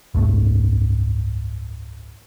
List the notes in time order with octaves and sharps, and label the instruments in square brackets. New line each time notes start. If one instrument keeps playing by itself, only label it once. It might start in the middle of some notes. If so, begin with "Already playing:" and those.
[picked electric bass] F#1 C#2 G#2 A3